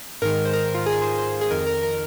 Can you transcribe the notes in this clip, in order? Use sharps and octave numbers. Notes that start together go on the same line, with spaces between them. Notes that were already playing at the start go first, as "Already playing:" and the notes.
G#2 D#3 A#4
C5
A#4
F4
G#4
C5
C5
G#4
F2 D#3 A#4
A#4
A#4